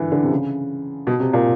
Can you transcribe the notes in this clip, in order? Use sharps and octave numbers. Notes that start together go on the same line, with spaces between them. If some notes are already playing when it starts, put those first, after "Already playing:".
Already playing: D3 E3
D3
C3
C#3
B2
C3
A#2